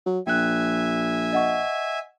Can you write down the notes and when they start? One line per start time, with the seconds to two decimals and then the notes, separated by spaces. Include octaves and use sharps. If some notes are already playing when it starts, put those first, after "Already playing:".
0.06 F#3
0.27 A#1 E5 G5 G#5 F#6
1.33 D#5 F#5 C#6